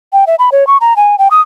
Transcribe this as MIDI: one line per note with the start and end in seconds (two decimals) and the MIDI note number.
0.13 0.25 79
0.27 0.35 76
0.39 0.50 83
0.52 0.67 73
0.67 0.77 85
0.81 0.96 82
0.96 1.16 80
1.18 1.28 79
1.31 1.41 87